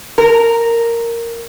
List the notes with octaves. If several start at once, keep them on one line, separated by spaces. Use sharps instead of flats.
A#4